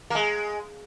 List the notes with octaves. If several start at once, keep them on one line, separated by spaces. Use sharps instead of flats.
A#3
G#3